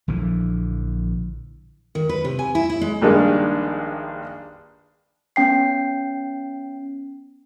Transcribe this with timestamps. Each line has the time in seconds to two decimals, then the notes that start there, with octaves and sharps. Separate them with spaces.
0.08 A#1 D3 E3 F3
1.95 D#3
2.09 B4
2.25 C3
2.39 G#5
2.55 E4
2.69 E4
2.81 G#3
3.02 A#1 G2 D#3 G#3
5.36 B3 C#4 G5 C7